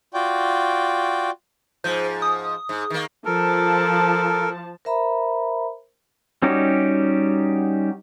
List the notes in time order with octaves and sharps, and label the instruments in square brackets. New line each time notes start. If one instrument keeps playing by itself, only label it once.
[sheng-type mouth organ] F4 F#4 D5 G5
[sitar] G#2 F3 [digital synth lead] C5
[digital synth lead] D#6
[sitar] G#2
D#3 A#3
[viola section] F3 A5 [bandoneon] A4 A#4
[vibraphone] A#4 C5 E5 A#5 B5
[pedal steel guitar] G3 C#4 D#4 F#4 G4